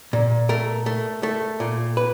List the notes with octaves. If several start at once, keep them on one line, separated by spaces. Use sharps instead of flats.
A#2
A3 A#4
A3
A3
A#2
B4